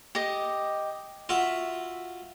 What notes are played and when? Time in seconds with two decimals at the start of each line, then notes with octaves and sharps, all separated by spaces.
0.15 G4 D#5
1.29 F4 F#4 E5